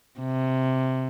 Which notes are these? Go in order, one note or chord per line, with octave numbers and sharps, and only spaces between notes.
C3